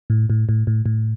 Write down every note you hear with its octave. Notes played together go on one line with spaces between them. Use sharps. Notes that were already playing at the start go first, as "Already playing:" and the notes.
A2
A2
A2
A2
A2